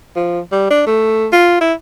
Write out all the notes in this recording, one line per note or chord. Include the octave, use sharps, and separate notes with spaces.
F3
G3
D4
A3
F4
E4